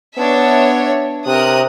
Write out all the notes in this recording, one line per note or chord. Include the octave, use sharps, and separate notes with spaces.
B3 D4 C#5 E5
C3 A#4 D#6 F#6